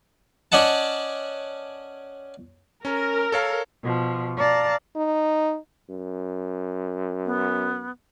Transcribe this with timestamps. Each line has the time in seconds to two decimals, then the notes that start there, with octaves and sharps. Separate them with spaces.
0.52 C#4 D5 D#5 F#5 A5
2.85 C#4 A#4
3.32 A4 C#5 F5
3.83 B2 F3
4.37 D5 F5 A5 A#5
4.96 D#4
5.90 F#2
7.26 B3